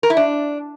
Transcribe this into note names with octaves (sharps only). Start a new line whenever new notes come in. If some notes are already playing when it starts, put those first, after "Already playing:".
A#4
E4
D4